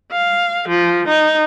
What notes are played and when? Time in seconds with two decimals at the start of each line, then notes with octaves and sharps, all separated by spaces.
0.12 F5
0.69 F3
1.08 D#4